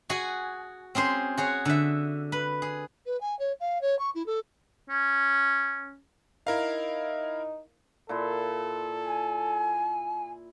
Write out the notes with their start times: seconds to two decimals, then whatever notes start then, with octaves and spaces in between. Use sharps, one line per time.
0.09 F#4 G#4 G#5
0.95 C4 C#4 G#4 C5
1.37 F#4 G#4 C#5
1.65 D3 E5
2.32 B4
2.62 G#4
3.06 B4
3.21 G#5
3.39 C#5
3.60 F5
3.81 C#5
3.99 C#6
4.15 E4
4.26 A4
4.90 C#4
6.47 D#4 E4 A#4 F5
8.09 A#2 E4 A4 C6
9.05 G#5